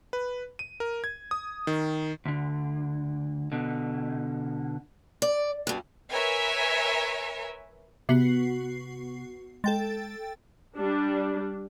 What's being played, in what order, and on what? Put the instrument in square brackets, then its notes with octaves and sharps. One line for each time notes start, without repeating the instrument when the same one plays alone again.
[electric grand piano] B4
D#7
A#4
G#6
D#6
D#3
[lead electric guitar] D2 D3
B2 D3
[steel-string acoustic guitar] D5
G2 B2
[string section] A#4 B4 C#5 E5 G#5
[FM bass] C3 [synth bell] B3 F#4 C7
[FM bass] G#3 [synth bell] A4 G5 A6
[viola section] G3 D4